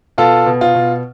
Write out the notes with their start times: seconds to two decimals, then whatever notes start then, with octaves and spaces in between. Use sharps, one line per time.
0.18 B2 F4 A4
0.46 B2
0.61 F4
0.75 B2